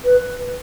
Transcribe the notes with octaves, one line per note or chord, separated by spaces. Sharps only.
B4